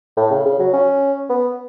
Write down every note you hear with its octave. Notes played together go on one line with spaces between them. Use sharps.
A2
C#3
C#3
F#3
C#4
B3